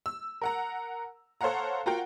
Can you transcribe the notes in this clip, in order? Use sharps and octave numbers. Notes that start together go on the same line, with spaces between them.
E6
A#4 F#5 A#5
A4 C5 C#5 F5 F#5 A#5
F4 F#4 A#4 F#5 G5